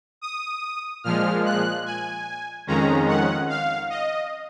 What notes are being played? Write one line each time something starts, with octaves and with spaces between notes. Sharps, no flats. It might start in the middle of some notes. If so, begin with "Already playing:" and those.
D#6
A#2 F3 G#3 F6
F#6
G#5
F2 D#3 G#3 C#4 A#5
F#5
F5
D#5